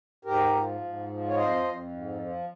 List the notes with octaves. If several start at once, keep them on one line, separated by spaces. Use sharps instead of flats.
G#2 G4 A#4
F3
G#2
F3
C#5
F2 C5 D#5
F2
G#2
F3